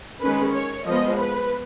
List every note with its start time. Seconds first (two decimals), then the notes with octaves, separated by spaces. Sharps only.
0.21 D#3 G#3 C#4 B4
0.54 C#5
0.86 F3 G#3 B3 D#5
1.19 B4